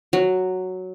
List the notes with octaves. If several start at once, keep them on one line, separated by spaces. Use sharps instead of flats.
F#3